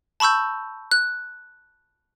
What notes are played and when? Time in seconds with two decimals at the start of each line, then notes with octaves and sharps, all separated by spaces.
0.20 A5 B5 C#6 E6 G6
0.91 F#6